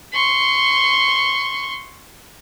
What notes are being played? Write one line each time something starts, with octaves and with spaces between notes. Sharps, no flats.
C6 C#6